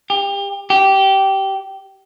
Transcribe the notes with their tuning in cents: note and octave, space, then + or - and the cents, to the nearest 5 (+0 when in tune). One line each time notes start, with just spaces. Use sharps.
G4 +30
G4 -15